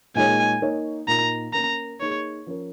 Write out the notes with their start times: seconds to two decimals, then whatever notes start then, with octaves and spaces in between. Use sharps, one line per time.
0.15 A#2 G#3 D#4 G#4 C#5 G#5
0.62 A#3 D#4 C#5
1.08 A#2 A#3 D#4 A#5
1.54 A#3 C#4 A#4 A#5
2.00 A#3 D#4 G#4 C#5
2.47 F3 C#4 A#4